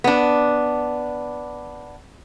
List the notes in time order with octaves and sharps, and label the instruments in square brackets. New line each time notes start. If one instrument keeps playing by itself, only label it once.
[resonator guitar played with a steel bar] B3 D4